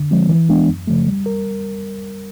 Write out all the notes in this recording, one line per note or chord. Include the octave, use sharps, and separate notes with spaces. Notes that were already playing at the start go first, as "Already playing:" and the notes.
Already playing: D3
F3 G#3 C4
E3
G#3 B3 D4
F#2
C#3 F3 A3
G3
A#4